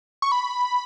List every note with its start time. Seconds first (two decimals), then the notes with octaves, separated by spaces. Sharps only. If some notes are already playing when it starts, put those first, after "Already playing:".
0.22 C#6
0.32 B5